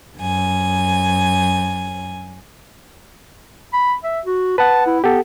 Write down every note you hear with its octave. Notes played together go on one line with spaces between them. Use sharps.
F#2 G#5
B5
E5
F#4
B4 F#5 A5
E4
B3 G4 A4